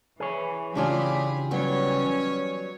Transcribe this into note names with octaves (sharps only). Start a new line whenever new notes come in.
E3 G#4 C#5
C#3 E3 C#4 D4 F4 G4 G#4 B5
F#3 G3 B3 C#4 C#5